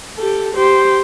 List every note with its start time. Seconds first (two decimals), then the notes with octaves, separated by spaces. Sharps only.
0.17 G4 A4
0.54 G4 C5